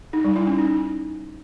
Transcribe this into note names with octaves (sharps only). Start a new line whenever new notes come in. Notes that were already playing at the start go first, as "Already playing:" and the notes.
D#4
G3
E4
C#4
D#4